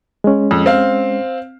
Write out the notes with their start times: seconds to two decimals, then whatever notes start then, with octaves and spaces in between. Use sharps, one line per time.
0.24 G#3 C#4
0.51 F2
0.66 C4 F5